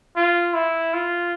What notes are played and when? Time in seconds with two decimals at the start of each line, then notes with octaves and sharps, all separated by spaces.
0.16 F4
0.54 E4
0.93 F4